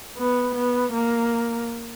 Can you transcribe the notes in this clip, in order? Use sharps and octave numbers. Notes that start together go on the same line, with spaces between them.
B3
B3
A#3